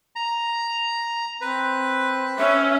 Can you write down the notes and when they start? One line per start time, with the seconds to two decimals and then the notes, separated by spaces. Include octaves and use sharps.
0.16 A#5
1.41 C4 B4
2.38 C#4 E5